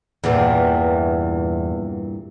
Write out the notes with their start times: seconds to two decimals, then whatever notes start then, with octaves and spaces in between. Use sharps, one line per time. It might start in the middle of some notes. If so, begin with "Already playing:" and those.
0.24 E2 G2 A#2 E3